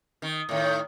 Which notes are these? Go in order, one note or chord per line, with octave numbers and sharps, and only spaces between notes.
D#3
A2 D#3